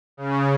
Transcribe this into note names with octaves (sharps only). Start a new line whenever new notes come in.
C#3